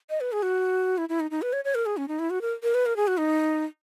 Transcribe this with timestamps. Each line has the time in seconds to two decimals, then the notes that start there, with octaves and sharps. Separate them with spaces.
0.10 D#5
0.21 B4
0.32 G#4
0.42 F#4
0.98 E4
1.09 E4
1.20 D#4
1.31 D#4
1.42 B4
1.53 C#5
1.65 C#5
1.75 A#4
1.86 G#4
1.97 C#4
2.08 D#4
2.19 E4
2.30 F#4
2.41 A#4
2.63 A#4
2.74 B4
2.86 A#4
2.96 G#4
3.07 F#4
3.18 D#4